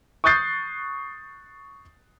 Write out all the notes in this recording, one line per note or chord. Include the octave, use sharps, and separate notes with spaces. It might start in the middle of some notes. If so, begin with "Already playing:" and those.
C#6 D#6 F#6 G6 A6 C7